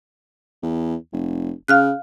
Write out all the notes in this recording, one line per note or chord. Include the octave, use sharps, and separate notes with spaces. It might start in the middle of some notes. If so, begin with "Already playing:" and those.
E2
F1
C#3 F5 F6 F#6